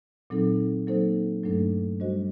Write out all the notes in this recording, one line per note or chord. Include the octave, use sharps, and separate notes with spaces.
A#2 F#3 C4 D#4 A4
F#3 A#3 D#4 A4 C5
G2 F#3 A3 D4 A4
G3 D4 F#4 C5 D#5